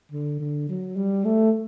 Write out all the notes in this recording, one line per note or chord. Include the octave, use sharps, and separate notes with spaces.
D3
D3
F#3
G3
A3